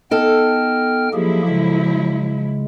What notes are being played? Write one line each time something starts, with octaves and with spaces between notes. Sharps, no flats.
B3 D#4 A4 G5 F6
F3 F#3 A#3 E4 G4 G#4
C#3 G#3